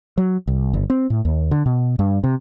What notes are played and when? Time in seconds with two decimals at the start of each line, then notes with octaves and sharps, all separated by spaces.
0.18 F#3
0.47 C2
0.73 G1
0.90 C4
1.10 A2
1.25 D#2
1.51 D3
1.66 B2
1.99 G2
2.24 C3